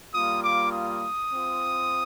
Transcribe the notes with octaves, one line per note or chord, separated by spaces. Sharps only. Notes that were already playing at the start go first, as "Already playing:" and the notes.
G3 A#3 F4 D#6
D6
D#6
C4 F4